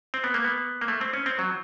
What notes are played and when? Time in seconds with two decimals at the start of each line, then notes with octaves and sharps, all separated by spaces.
0.14 C4
0.24 B3
0.34 A#3
0.44 B3
0.81 A#3
0.88 A3
1.01 C4
1.13 C#4
1.26 C4
1.39 F#3